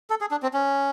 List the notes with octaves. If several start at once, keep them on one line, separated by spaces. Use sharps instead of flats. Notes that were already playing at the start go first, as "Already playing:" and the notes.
A4
G#4
D4
C4
C#4